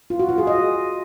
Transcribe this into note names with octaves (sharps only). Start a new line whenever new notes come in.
F4
F#4
F4
G#4
D#5